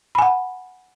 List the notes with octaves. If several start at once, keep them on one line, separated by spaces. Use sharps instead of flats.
F#5 G#5 B5